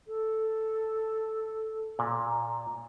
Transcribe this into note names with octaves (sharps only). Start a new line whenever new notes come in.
A4
A#2 A#5